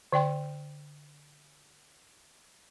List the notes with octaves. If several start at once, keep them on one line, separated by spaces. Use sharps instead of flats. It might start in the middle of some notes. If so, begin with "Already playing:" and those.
D3 D5 G5 C6